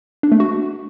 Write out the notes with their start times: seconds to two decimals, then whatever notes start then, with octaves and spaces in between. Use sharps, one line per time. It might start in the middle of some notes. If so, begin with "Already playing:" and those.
0.23 D4
0.32 A3
0.40 F#4